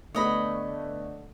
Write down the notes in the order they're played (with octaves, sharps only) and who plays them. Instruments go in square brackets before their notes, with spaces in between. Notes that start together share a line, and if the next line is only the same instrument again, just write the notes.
[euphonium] D3 [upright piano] A3 B3 [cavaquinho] C#5 D#5 B5